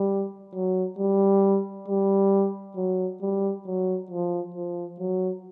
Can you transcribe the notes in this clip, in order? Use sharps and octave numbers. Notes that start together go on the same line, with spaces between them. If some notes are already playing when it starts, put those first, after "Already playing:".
Already playing: G3
F#3
G3
G3
F#3
G3
F#3
F3
F3
F#3